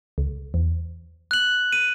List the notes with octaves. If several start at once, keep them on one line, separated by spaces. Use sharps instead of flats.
C#2
E2
F#6 F#7
D#7